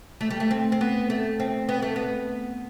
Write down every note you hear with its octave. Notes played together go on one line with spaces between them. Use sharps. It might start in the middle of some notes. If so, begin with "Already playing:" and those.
A3
G3
A3
C4
C4
B3
A3
C4
B3
A3
B3